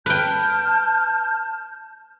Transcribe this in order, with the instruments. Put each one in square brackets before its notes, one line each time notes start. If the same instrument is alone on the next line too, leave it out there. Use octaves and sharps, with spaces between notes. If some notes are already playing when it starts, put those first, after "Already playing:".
[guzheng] B4 G5 [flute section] A5 F6 G6